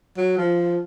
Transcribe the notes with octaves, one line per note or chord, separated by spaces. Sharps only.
F#3
F3